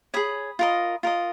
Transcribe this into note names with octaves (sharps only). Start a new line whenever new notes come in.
G#4 C#5 B5 D#6
F4 A#4 D#5
F4 A#4 D#5